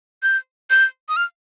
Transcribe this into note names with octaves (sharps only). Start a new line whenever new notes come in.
G6
G6
D#6
F6